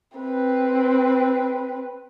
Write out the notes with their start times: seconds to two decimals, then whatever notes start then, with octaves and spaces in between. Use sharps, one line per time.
0.18 C4 B4